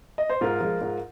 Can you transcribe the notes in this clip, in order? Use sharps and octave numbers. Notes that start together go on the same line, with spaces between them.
D#5
C5
G#2 F4 A#4
F3 G#3
G#2